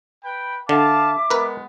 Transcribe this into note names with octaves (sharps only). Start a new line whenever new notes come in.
B4 G5 B5
D3 E5 F5 A5 D6
G#3 B3 A#4 B4